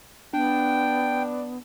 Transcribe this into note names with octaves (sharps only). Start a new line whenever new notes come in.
B3 D4 G5